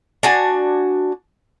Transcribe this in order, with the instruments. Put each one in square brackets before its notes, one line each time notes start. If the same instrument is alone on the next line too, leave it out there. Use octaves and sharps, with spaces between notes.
[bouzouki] D4 F#4 G#5